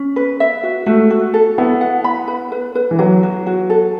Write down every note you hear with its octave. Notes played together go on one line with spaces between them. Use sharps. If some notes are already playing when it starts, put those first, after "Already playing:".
Already playing: C#4
B4
E5
F#4
A3 F#4
F#4
A4
B3 E4
F#5
B5
B4
B4
B4
E3
F#3 B4
F#4
F#4
A4